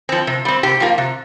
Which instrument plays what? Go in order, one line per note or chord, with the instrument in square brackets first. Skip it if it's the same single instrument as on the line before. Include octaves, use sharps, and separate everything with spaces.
[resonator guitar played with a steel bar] F3 C4
C3
G3 C4
C3 G4
F3 A#3 F4
C3